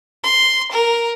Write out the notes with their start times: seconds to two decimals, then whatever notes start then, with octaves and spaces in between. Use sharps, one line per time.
0.24 C6
0.71 A#4